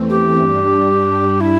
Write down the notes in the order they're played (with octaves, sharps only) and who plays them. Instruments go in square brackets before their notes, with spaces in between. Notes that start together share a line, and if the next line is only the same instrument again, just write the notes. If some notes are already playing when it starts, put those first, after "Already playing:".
Already playing: [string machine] E2 E3 A3 C4
[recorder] G4
[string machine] G2 G3 D4
[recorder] E4